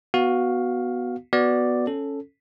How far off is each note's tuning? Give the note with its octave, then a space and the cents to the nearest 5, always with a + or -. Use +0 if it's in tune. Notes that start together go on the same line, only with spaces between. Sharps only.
B3 +0 F#4 +0 F5 +15
B3 +0 F#4 +0 D5 +0
C#4 +0 A4 +0